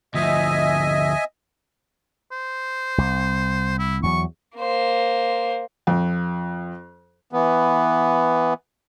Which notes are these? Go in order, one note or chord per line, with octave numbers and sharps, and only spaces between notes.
D2 F3 D#5 E5 G#5
C5
C2
E4
E2 F#3 C#6
A#3 C5
F2
E3 B3